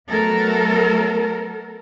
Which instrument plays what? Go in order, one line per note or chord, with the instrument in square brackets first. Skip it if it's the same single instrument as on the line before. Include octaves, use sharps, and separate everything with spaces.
[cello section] F#3 A3 B3 A4 A#4